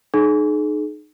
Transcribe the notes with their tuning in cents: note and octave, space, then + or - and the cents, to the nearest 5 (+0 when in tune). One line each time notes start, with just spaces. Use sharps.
D#4 -30 G#4 +35